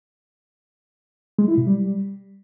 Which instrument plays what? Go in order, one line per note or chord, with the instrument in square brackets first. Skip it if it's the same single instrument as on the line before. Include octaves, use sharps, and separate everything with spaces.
[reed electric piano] G#3
E4
B2
G3